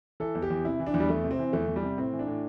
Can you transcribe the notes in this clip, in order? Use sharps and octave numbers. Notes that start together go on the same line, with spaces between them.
E3 A4
E2
G4
E2
C3 E4
E3
D4
E2
G3
E2 A3
C3
C4
E3
E2 A3
E2
G3
C3
A2 C4
E3
D4
A2